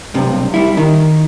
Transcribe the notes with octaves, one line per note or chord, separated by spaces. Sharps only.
B1 G2 C3
G3 E4
D#3